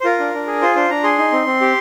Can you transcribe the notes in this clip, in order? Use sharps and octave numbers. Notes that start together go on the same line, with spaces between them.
C5
F4 A#4
D4
D4
G#4
F4 C5
D4 C5
D4 A#5
G#4 C6
D#4
C4
C4
G4